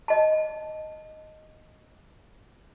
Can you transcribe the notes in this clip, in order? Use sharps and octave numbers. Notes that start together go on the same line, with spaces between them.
D#5 A5